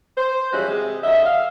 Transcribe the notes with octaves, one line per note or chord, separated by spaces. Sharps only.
C5
E3 F3 G3 G#3 C#4 F#4
C3 G#3
D3 F#3 D#5 E5
F5